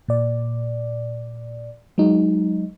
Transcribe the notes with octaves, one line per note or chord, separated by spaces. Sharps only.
A#2 D5
F#3 G#3 D#4